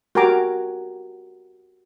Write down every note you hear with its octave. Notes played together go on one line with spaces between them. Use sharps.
F#4 G4 A#4 G#5 A#5 D6